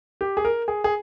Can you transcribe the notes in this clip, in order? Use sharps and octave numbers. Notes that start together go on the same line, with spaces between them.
G4
G#4
A#4
G#4
G#4